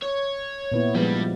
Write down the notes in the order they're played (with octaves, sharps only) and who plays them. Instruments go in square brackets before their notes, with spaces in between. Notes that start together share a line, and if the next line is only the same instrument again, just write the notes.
[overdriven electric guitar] C#5
[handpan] A#2 B3 E4
[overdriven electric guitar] G2 G3 [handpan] F3 G#3 B3